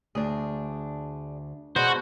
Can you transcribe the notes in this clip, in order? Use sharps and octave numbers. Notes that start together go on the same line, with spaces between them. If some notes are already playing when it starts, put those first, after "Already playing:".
D2 D4 G#4
B2 G#3 D4 F#4 C5